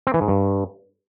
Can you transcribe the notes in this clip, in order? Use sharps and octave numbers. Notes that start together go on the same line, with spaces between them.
C4
E3
G#2
G2